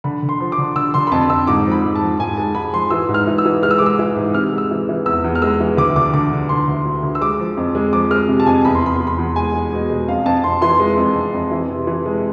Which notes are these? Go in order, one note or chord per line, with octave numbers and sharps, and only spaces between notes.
D3 B5
D3
C6
F3
D6
D3
D3 E6
D3 C6
B5
F2 A5
F2 E6
G#2 D6
F3
B5
G#2
A5
F3
G#2 G#5
G#3 A5
G#2 B5
F3 C6
E3 E6
G#2
F6
E3
E6
E3
G#3 F6
E6
G#3 D6
E6
E3
G#2
C3 F6
G#3
E6
E3
E3
E2 E6
E2
F6
G#3 E6
E3
D2 D6
D3 D6
D3 D6
D3
D3 C6
D2
D2
D2
E6
G#3 D6
F3
F2
G#3
F3 D6
G#3 F6
C3
A5
F2 G#5
E2 B5
C6
E2 B5
E2 C6
B5
E2
G#3 G#5
G#3
B2
G#3
F2 F5
F2 A5
F2 C6
E3 C6
G#3
F2
F2
F2
E3
C3
E3
G#3